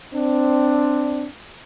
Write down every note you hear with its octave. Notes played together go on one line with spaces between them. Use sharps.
C4 D4